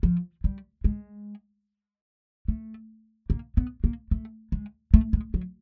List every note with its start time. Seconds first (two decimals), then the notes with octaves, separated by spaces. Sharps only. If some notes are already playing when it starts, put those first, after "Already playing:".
0.03 F3
0.44 G3
0.84 G#3
2.48 A3
3.30 A#3
3.57 B3
3.84 A#3
4.11 A3
4.52 G#3
4.94 A3
5.13 G#3
5.34 F#3